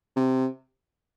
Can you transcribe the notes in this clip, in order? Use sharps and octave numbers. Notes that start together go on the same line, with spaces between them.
C3